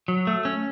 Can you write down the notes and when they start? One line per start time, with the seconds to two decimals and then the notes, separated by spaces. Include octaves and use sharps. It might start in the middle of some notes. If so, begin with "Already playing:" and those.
0.08 F#3
0.27 A3
0.45 C#4